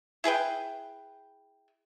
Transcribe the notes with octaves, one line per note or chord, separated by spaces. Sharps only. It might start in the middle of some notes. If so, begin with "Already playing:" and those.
E4 G#4 B4 G5